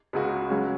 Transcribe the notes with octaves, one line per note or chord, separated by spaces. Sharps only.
C#2 C#3 G#3 F#4
C#3 F#3 C#4 F#4